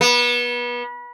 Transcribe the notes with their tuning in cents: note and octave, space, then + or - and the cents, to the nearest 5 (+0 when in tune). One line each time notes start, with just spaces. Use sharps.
B3 -30